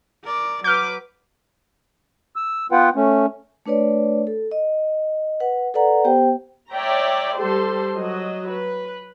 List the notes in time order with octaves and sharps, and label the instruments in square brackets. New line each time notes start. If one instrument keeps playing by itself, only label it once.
[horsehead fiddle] A#4 D5
[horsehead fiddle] F#3 B4 [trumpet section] D6 [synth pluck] F6 G6
[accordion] E6
B3 F4 B4 F#5 G5
A3 C#4
[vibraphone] A3 D4 B4 C#5 D5
A4
D#5
B4 F#5
A4 B4 D5 F#5 A#5
B3 G4 C5 G5
[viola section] C#5 D5 E5 G5 A#5
G3 G4 A4 C5 C6
F#3 F#4 D#5
B4